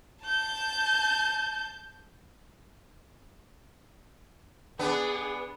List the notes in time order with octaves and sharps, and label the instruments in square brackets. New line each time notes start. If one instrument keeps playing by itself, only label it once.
[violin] A5 G6
[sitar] B3 D4 [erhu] G#4